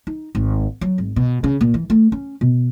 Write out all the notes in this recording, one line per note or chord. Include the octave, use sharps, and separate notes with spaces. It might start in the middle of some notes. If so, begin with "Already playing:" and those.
D#4
G#1
F#3
G#1
B2
C#3
A#2
E3
A3
C#4
B2